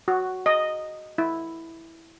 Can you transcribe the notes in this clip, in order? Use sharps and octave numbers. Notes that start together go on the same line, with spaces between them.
F#4
D#5
E4